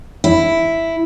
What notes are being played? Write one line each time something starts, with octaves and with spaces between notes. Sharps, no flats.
E4